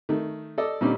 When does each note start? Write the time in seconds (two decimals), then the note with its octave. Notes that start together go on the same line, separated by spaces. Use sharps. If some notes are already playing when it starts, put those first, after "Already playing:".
0.09 D#3 A3
0.58 A4 D5 D#5
0.81 A#2 D3 G3 C4 C#4 D#4